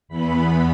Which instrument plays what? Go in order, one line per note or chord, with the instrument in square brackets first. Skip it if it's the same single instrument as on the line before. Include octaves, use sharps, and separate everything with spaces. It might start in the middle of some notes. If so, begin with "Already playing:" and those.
[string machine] E2 E3 B3 B5